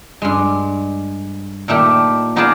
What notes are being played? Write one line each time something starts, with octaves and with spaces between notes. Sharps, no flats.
G2 G#3
A#2 D#3 A3 G4
B3 D#4 F4 G#4 D5 A5